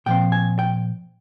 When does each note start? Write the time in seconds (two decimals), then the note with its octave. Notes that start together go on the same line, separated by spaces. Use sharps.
0.06 A#2 F3 C4 G5
0.32 G#5
0.59 G5